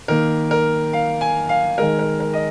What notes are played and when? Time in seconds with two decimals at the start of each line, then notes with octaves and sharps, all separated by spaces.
0.08 D#3 A#3 A#4
0.51 A#4
0.93 F5
1.21 G#5
1.49 F5
1.78 D#3 G#3 A#4
1.99 A#4
2.20 A#4
2.34 D#5